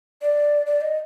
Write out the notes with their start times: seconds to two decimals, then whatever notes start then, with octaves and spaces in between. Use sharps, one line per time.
0.22 D5
0.66 D5
0.81 D#5